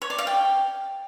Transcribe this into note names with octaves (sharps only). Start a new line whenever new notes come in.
C#5
D5
F5
G5